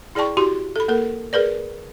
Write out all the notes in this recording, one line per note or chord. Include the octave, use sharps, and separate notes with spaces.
E4 G#4 D5 G5 A5 C#6
E4 F#4 G4 C6
A4 B5
A#3 A4 A#4
G#4 A#4 B4 D5